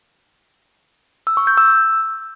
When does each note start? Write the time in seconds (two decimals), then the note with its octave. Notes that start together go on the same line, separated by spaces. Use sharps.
1.27 E6
1.37 C#6
1.47 G6
1.57 E6